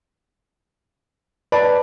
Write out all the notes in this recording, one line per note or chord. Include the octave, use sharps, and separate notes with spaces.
B4 D5 A5